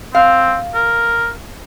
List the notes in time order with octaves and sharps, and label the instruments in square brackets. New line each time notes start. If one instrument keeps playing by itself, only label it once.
[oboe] C4 [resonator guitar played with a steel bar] F5
[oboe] A#4